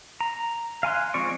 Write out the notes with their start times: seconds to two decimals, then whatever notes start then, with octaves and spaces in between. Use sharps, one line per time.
0.21 A#5
0.83 F5 G#5 C6 F#6
1.14 F3 G#3 C4 D5 C#6